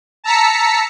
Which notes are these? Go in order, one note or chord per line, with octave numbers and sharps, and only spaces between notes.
A5 A#5 E6 B6 C#7